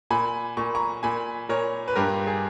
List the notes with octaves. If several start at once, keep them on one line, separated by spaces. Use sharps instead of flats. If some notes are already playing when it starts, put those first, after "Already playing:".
A#2 G#5 B5
A#2 C#6
A#5 C#6
A#2 G#5 B5
A#2 A#4 C#5
B4
G2 G4 A#4
G#4